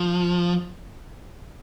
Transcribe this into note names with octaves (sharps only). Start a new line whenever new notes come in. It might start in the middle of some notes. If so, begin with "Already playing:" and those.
Already playing: F3